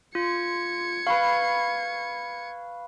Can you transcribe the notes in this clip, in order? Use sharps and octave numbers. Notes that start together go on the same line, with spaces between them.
F4 G#6 C#7
B4 F5 B5 C#6